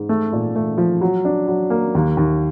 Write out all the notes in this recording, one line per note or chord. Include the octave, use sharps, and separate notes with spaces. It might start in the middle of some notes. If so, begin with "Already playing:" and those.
Already playing: G#2
A3
A#2
A3
F3
F#3
D4
F#3
A#3
D#2
D#2